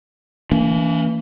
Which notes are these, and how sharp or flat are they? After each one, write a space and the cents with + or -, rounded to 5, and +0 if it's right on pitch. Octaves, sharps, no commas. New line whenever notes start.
E3 +0 A#3 -30 C#4 +45